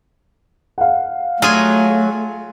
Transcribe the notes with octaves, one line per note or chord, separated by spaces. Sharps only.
F5 F#5
F#3 A3 F4 G#4 G#5